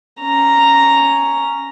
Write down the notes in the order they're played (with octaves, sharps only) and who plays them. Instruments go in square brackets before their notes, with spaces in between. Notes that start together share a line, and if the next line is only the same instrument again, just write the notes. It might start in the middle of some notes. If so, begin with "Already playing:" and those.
[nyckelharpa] C#4 A#5